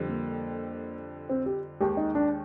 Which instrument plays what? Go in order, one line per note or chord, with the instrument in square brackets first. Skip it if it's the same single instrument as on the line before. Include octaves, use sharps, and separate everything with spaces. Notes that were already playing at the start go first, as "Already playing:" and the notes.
Already playing: [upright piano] F2 D3 G3
[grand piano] A#3
C4
G4
[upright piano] D#2 D#3 G#3 [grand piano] G4
[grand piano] D#4
D4